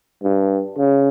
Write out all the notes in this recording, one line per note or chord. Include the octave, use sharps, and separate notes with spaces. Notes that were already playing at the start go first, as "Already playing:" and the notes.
G2
C#3